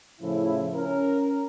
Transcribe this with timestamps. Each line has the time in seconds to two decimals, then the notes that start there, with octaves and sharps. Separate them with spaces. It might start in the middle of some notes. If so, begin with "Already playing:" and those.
0.21 A2 C#3 F3 E4
0.74 C#4 A#4